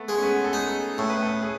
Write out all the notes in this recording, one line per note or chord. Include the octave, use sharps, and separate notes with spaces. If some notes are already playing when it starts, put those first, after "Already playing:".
Already playing: A3 B3
G#3
C#4
B3
A4
D#4 G#4
A2 A4
B4
A4
G#4